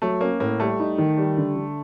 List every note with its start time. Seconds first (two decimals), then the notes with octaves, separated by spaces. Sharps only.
0.02 F#3 A3
0.21 A#3 C#4
0.40 A2 A#3
0.60 G3 A3
0.80 D#4
0.98 D#3
1.17 G3
1.37 D3
1.56 D3